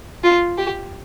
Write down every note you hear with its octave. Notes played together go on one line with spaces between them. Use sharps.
F4
G4